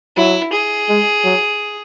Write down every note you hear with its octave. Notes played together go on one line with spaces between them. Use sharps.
F#3 E4
G#4
G#3
F#3